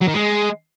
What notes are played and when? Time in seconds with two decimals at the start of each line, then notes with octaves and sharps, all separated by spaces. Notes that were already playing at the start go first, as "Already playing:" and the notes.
0.02 F#3
0.08 D#3
0.15 G#3